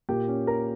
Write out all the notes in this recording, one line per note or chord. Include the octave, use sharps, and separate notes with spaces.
A#2 G4 G5
C#4
A#3 A#4 A#5